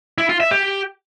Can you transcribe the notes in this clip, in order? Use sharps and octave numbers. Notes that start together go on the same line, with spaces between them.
E4
F4
E5
G4